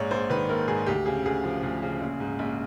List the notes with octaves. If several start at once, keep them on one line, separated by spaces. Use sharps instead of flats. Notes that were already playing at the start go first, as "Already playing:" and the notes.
Already playing: A#1 G#2 C#5 D5
A#1 C5
D#3 B4
A#1 A#4
G#2 G#4
D2 G4
C#3 G#4
D2 G#4
F3
D2
C#3
A#1
G#2
A#1